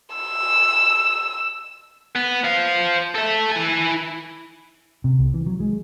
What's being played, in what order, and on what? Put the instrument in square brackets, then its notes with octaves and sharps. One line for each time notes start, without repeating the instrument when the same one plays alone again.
[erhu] E6
[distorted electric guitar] B3
C5 F5
A4 E5
E4 G#5
[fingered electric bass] C3
C2
E3
F#3
G#3